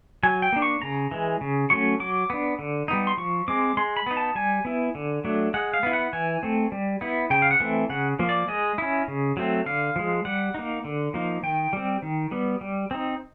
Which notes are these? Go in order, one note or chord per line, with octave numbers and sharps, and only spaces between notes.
F#3 G#5
G5
A#3 D4
C#6
C#3 A#5
E3 G#3
C#3
F#3 A3 C#4 C#6
F#3 D6
B3 D4
D3
G3 B3 D#4
C6
F3 C#6
G#3 C4 D6
G#3 C6
B5
B3 D#4
A5
G3 G#5
B3 E4
D3
F#3 A3 D4
G#3 F#5
F5
B3 E4
F#5
E3 G#5
A3 C4
G3
B3 E4
C#3 G5
F5
F#5
E3 A3 C4
C#3 F#5
F3 A#3
D5
G#3 D#5
C#4 E4
C#3
F#3 A3 C4
D3 F5
F3 G#3
G3 F#5
A#3 D#4
D3
F3 A#3 D#4
D#3 G5
G3 C4
D#3
G3 B3
G3
C4 D#4